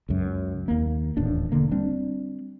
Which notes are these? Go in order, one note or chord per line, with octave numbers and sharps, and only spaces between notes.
C#2 F#2
D#2 A#3
D#1 E2 A2 D4
E1 D3 A#3
G3 C4 D4